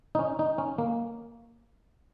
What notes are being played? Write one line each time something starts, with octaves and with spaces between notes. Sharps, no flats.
D#4
C#4
D#4
C#4
A#3